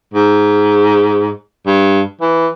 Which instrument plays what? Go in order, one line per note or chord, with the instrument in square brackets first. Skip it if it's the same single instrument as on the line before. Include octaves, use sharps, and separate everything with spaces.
[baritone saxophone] G#2
G2
E3